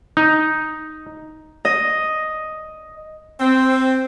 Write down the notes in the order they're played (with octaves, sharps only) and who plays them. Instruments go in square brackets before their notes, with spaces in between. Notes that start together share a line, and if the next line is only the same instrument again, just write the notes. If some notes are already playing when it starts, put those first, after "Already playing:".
[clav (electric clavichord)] D#4
[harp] D#5
[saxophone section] C4